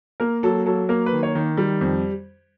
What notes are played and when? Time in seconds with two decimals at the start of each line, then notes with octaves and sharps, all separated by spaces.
0.20 A#3 A#4
0.43 F#3 A4
0.66 F#3 A4
0.89 A#3 A#4
1.06 B4
1.13 D#3
1.23 C#5
1.35 D#3
1.58 G3
1.81 F2